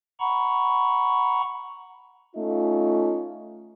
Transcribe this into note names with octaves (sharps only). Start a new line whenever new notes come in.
F#5 A#5 B5 C#6
A3 C#4 D#4 F4